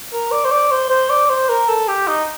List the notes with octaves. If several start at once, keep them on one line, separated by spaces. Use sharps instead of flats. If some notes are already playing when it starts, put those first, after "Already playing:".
A#4
D5
C5
D5
C5
C5
D5
C5
A#4
A4
G4
D#4